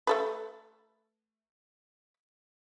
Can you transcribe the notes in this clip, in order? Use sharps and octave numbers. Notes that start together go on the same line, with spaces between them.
A3 A4 B4